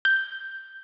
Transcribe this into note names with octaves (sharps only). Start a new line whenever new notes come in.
G6